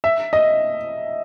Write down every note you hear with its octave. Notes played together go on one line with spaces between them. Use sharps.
E5
D#5